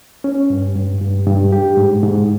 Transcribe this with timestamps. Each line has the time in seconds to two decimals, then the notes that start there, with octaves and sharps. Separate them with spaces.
0.24 C#4
0.50 G2
0.75 G2
1.01 G2
1.27 G2
1.52 G4
1.77 G#2
2.03 G#2